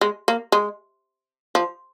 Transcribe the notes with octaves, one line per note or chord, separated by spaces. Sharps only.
G#3
A#3
G#3
F3